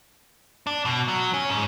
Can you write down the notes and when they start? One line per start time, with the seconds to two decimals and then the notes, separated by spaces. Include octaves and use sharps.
0.67 D4
0.85 B2
1.08 F#3
1.34 C#4
1.49 G#2